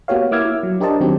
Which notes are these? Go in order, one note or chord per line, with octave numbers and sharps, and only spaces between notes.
A#3 B3 F#4 G4 C#5 F5
A#3 E4 D6 E6 F6 G#6
E4
F#3
D4 G4 A#4 C5 D#5 A5
D#3 F#3 C4 G4